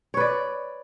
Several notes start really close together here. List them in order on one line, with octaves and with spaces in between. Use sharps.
C#5 B4 D5